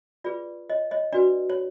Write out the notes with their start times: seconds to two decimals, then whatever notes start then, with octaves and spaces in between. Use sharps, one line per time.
0.24 F4 G#4 B4 D5
0.70 C#5 D#5
0.91 C#5 D#5
1.13 D4 F#4 B4 D5
1.50 C#5